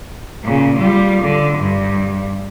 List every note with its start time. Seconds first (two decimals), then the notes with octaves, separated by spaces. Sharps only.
0.44 A#2 C#3
0.76 G3 F4
1.23 D3
1.59 G2